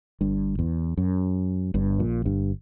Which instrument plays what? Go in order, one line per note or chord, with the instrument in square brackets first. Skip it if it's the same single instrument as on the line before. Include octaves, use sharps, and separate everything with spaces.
[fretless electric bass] G1 G2
E2
F#2
G1 G2
A#1 A#2
G1 G2